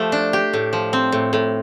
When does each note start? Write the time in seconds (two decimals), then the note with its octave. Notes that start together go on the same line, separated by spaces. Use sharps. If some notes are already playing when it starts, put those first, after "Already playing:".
Already playing: F3 A3 G4
0.12 D4
0.33 G4
0.53 A2
0.73 F3
0.93 C4
1.12 A2
1.33 A2